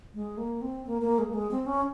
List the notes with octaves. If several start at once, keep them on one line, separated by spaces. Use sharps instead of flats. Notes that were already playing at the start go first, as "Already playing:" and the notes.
G#3
A#3
C4
A#3
A#3
G#3
A#3
G#3
C4
C#4